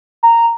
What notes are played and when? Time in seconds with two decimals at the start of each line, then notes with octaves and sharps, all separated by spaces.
0.23 A#5